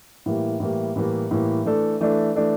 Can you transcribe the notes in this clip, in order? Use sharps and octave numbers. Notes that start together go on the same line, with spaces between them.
A2 E3 G3 A#3
A2 E3 G3 A#3
A2 E3 G3 A#3
A2 E3 G3 A#3
E3 A3 D4 A4
E3 A3 D4 A4
E3 A3 D4 A4